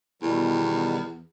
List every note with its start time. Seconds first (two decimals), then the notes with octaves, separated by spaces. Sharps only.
0.22 E2 B2 D#3 G3